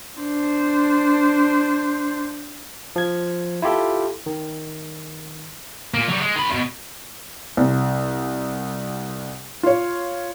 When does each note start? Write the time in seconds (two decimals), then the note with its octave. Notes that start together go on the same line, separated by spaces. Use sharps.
0.20 D4 C5
2.96 F3 G#6
3.62 E4 F4 G4 A4
4.26 D#3
5.94 A#2 A#3
6.09 F#3 G3
6.21 G#3
6.35 D#3 B5
6.49 E2 B2
7.57 C2
9.63 F4 C#5